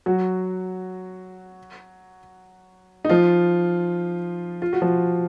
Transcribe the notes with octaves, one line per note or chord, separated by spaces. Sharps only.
F#3 F#4
D#4
F3 F4
F4
F#4
F3 F4